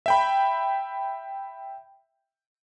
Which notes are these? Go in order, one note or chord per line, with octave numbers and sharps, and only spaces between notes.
E5 G5 B5